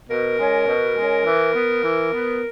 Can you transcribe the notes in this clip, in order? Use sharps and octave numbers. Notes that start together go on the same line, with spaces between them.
B2 A#4
G#3 C#4
B2
G#3 C#4
E3
B3
E3
B3